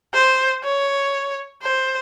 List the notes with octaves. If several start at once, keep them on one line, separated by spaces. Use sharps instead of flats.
C5
C#5
C5